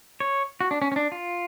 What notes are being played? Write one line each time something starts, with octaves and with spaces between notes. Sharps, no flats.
C#5
F#4
D4
C#4
C#4
D4
F4